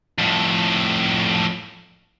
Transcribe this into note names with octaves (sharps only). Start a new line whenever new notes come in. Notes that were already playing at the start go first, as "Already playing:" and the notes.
F2 A2